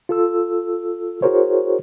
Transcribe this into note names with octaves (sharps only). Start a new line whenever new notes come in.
F4 A4 E6
E4 F#4 G#4 A#4 C5 C#5